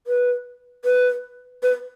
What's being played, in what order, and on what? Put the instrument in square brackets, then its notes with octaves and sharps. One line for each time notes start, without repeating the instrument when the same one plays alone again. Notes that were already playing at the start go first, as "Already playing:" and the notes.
[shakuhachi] B4
B4
B4